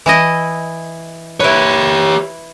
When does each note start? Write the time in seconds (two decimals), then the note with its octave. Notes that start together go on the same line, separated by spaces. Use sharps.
0.06 E3 E4 D#5
1.40 E4 G4 B4 C#5